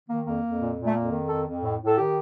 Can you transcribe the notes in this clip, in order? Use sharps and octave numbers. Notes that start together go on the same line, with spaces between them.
D#3 A#3
F2 A#3
F2
A#2
A#2
A3
F2 A#3
D#3
F2 A4
F2
A2
A2
A4
D#3 G4